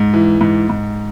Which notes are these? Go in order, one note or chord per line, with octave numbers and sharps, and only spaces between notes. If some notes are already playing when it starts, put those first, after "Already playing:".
Already playing: G#2
E3
G#2
G#2